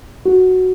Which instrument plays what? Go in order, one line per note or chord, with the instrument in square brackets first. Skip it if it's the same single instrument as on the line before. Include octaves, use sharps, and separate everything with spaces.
[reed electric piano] F#4